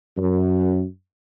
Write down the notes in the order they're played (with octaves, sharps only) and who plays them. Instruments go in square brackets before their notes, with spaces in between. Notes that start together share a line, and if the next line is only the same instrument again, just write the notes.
[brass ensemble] F#2